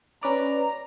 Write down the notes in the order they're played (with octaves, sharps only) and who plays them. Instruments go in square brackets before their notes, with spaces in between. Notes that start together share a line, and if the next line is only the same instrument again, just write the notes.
[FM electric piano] C#4 B4 D5 [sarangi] A#5